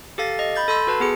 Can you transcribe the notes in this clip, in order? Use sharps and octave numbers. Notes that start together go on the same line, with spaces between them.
G4 A4 F5 A6
D#5
B5 G6 A6
A4 B5 C6 E6
F#4 B4 A5
B3 G#4 C#7